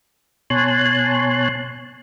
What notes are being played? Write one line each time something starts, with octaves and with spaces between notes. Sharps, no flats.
B2 C#5 G#5 A5 C6 F#6